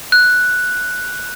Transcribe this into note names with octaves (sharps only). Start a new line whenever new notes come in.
F#6